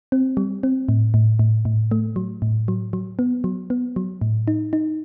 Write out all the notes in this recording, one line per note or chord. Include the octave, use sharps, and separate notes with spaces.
C4
G3
C4
A2
A2
A2
A2
A3
F#3
A2
F#3
F#3
B3
F#3
B3
F#3
A2
D#4
D#4